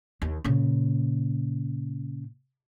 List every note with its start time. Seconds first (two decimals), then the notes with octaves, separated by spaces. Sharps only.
0.22 D#2
0.44 A#2 C#3